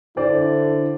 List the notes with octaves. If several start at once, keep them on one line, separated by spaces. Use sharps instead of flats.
D3 E4 C5 D5